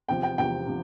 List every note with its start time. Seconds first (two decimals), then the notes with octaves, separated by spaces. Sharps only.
0.08 E2 C3 F3 G5
0.23 G5
0.38 E2 C3 F3 G5
0.68 C3 F3